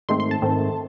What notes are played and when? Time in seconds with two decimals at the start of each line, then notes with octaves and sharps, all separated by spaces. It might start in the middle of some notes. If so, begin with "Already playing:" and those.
0.09 G#2 D#3 A3 C4 C6
0.20 C6
0.31 A5
0.42 G#2 D#3 A3 C4